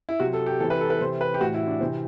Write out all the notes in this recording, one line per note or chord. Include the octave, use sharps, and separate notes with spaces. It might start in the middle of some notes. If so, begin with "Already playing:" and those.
E4
C3 F#3 F#4
A4
G4
C3 E3 A4
B4
A4
B4
C3 E3 C5
B4
G4
A2 E3 F#4
E4
D4
C3 E3 C4